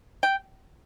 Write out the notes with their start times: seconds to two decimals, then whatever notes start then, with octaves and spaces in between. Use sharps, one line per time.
0.23 G5